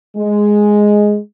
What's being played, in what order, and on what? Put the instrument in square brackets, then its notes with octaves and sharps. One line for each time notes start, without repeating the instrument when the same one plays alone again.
[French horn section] G#3